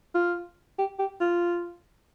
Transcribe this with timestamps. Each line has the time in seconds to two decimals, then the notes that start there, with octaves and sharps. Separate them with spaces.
0.15 F4
0.78 G4
0.99 G4
1.21 F4